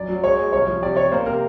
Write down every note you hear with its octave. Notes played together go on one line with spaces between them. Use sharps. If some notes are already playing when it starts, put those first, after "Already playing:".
Already playing: F#2 D5
F#3
G#3 C#5
G#3
C2 C#5
F3
C3 D5
C3 C#5
A#3 C5
C3 A#4